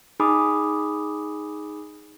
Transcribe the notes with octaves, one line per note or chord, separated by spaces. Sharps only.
D#4 G#4 G#5 B5 D6 D#6